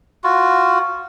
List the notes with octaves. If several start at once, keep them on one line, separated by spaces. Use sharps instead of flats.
F4 F#4